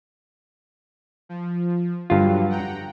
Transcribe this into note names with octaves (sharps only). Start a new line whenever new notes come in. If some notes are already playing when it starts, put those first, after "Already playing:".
F3
G2 D3 F#3 F4
F#5 G5 A#5